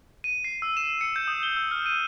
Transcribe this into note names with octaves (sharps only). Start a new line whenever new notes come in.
D#7
C7
E6
E7
C#7
G6
D#6
G7
E6
F6
D#7